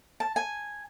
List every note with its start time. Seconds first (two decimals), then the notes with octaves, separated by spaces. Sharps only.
0.20 A5
0.36 G#5